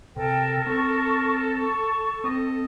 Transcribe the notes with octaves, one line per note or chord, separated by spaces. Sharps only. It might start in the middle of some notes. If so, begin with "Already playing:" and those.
C3 A4 A#4 G5
C4 C#6
C#6
C4 D#5